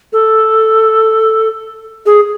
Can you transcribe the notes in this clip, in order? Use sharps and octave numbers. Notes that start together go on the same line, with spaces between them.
A4
G#4